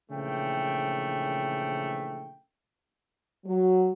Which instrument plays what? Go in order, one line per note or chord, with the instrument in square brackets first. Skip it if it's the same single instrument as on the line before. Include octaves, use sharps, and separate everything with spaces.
[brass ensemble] A#1 C#3 E3 A3 G5
[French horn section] F#3